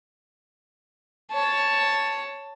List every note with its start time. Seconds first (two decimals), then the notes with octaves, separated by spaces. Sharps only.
1.31 C#5 A5